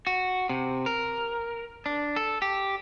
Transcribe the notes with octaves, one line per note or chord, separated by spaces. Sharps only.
F#4
C3
A#4
D4
A4
G4